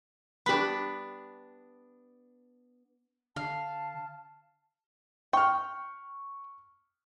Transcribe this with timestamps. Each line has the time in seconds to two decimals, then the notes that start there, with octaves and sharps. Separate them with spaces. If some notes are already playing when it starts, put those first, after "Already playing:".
0.46 B3 D4 G4 B5
3.36 D3 F5 A5
5.33 G5 C#6 F6